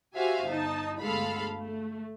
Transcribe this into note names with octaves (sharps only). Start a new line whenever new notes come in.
F#4 G4 C5 E5 F5 G#5
G1 D#4 A5
G1 D2 G#3 A4 F5 B5
A3